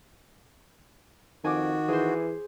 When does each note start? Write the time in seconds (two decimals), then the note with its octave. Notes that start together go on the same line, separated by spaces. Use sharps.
1.44 F2 D#3 F#4 G#5 D6
1.88 E3 G#4 C5